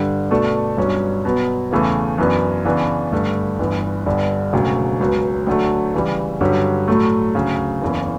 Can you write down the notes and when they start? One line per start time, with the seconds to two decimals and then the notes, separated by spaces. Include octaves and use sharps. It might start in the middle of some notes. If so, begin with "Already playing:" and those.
Already playing: G2 D3 G3
0.31 B2 A3 D4 A4
0.77 G1 G2 F#3 C#4
1.25 B2 F#3 B3
1.71 E2 C#3 E3 A3
2.18 F#2 E3 B3 D4
2.65 C#3 E3 B3 D4
3.12 G2 D3 A3
3.59 G1 G2 E3
4.06 G1 G2 D3 G3
4.53 E1 D2 C#3 F#3
5.00 C#2 B2 F#3
5.47 D2 D3 F#3 A3
5.94 C#3 E3 G3
6.41 G2 D3 F#3 C#4 G4
6.88 A2 F#3 A3
7.35 D2 C#3 F#3
7.82 F#1 E2 C#3 E3